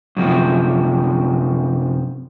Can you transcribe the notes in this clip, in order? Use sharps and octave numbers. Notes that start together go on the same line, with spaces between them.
F#2 C3 F3